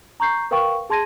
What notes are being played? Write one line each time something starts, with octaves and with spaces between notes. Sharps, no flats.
A#5 C#6 G6 C7
A#4 B4 F5 G5 C#6
G#4 A5 C6 G#6 A#6 D#7